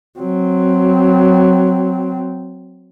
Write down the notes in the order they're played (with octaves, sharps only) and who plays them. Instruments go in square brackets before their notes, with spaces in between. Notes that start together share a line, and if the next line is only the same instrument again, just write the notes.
[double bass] F#3 C4